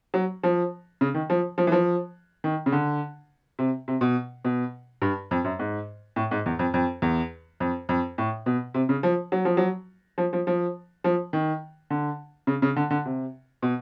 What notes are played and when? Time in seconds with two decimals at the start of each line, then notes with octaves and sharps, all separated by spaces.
0.14 F#3
0.43 F3
1.01 C#3
1.14 D#3
1.30 F3
1.58 F3
1.67 E3
1.72 F3
2.44 D#3
2.66 C#3
2.72 D3
3.59 C3
3.88 C3
4.01 B2
4.45 B2
5.02 G2
5.31 F2
5.44 F#2
5.59 G#2
6.16 A2
6.31 G#2
6.46 E2
6.59 F2
6.74 F2
7.02 E2
7.60 F2
7.89 F2
8.18 A2
8.46 B2
8.74 C3
8.89 C#3
9.03 F3
9.32 F#3
9.45 F3
9.57 F#3
10.18 F3
10.33 F3
10.47 F3
11.04 F3
11.33 D#3
11.90 D3
12.47 C#3
12.62 C#3
12.76 D3
12.91 D3
13.05 C3
13.62 B2